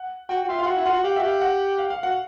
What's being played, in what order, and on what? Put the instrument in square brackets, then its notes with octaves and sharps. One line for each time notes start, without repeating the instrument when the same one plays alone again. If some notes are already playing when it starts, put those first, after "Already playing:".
Already playing: [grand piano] F#5
[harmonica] F#4 [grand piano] G5
[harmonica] F#4
[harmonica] F4 [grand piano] E5
[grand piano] F5
[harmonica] F4
[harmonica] F#4 [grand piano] F#5
[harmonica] E4
[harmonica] F4 [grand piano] F#5
[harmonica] F#4
[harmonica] G4 [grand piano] F5
[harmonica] F#4 [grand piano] E5
[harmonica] G4
[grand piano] F5
F#5
F5
F5
[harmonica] F#4 [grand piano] F#5